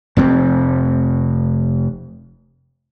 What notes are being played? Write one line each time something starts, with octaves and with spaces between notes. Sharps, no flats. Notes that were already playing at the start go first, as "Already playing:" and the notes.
F1 F2 C4